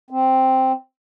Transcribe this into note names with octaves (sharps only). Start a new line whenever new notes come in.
C4